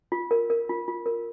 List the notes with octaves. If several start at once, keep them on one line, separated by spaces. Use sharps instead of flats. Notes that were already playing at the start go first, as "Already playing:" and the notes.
F4
A#4
A#4
F4
F4
A#4